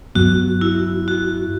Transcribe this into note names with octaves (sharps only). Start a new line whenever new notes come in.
G2 F#3 B3 F#4
E4
F#4